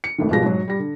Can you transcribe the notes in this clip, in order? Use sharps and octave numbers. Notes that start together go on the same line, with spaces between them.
C#7
G#1 A2 D#3
G#1 B2 F3 G3 G#4 A#6
G#2 F#3
G3 A#6
D3